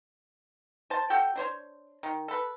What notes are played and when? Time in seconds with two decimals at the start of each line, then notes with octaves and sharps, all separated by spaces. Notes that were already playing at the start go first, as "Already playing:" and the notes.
0.90 C5 A5
1.10 F#4 G4 A4 G5
1.36 D4 C5 C#5
2.03 D#3
2.28 A4 B4